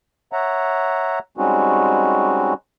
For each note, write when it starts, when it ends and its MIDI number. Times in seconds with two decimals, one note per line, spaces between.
0.33 1.19 73
0.33 1.19 76
0.33 1.19 78
0.33 1.19 82
1.37 2.54 55
1.37 2.54 56
1.37 2.54 60
1.37 2.54 61
1.37 2.54 63
1.37 2.54 66